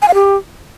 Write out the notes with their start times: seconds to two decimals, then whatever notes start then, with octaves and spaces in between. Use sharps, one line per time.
0.02 G#5
0.08 F5
0.14 G4